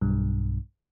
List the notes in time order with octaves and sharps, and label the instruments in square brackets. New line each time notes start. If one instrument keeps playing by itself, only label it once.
[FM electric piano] B1 G2